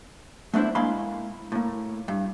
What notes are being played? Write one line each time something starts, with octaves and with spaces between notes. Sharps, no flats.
A3 B3 D4 E4 C5
G#3 A#3 E4 F5 B5 C6
A2 A#3
G2